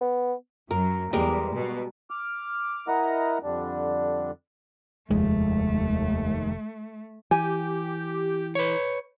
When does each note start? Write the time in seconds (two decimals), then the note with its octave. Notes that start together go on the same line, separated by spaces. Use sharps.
0.01 B3
0.71 F#2 F#3 A#4
1.13 E2 G3 G#3 A#4
1.55 B2
2.10 D6 F6
2.88 E4 A#4 D#5 F#5 A#5
3.43 F2 D3 G3 D4
5.10 F1 D#2 F3 G#3 A3
7.31 E3 G4 G#5
8.55 B4 C#5